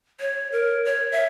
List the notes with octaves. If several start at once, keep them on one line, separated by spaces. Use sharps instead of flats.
C#5
A#4
C#5
E5